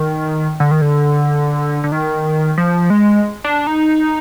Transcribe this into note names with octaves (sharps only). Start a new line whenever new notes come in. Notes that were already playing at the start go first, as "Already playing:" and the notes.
Already playing: D#3
D3
D#3
D3
D3
D#3
F3
G#3
D4
D#4